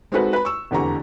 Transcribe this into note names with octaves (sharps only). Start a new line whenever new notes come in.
G#3 C4 D#4 F#4 A4 B4
B4 B5
C#6 E6
F1 E2 D3 G4 A#5 C#6